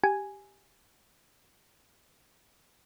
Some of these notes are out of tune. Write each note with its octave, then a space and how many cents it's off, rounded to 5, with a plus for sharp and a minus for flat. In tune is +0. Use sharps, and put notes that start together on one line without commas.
G4 +0 G#5 +0